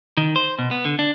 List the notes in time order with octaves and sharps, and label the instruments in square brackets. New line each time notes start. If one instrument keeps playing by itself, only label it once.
[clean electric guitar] D#3
C5
B2
B3
D3
D4